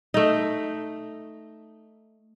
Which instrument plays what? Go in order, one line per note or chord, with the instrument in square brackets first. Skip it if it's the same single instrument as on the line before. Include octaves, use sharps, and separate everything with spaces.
[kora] A3 D#4